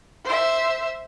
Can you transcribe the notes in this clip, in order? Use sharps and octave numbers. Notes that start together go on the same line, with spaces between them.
C5 E5